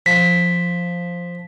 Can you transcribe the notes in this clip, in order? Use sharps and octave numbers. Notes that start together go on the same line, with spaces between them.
F3 B6